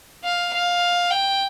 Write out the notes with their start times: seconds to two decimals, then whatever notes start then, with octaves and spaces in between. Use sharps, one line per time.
0.24 F5
0.54 F5
1.11 G5